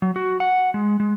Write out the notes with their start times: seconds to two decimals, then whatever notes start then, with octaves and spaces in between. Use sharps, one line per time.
0.02 F#3
0.16 F#4
0.40 F#5
0.74 G#3
1.00 G#3